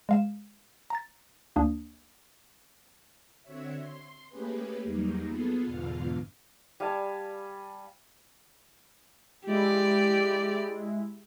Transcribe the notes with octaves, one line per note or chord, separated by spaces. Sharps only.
G#3 F5 E7
A#5 A6
D2 A#3 D4 D#6
D3 C4 F#4 C#5 E5
C6
A3 A#3 C#4 G4 G#4 B4
E2 F#3 G3 A#3 D#4
B3 F4 G#4 A4
E2 G#2 B2 D3 F4 F5
G3 F5 G#5 A5
G#3 E4 G4 D5